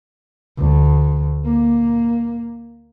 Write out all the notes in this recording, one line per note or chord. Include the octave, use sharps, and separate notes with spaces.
D2
A#3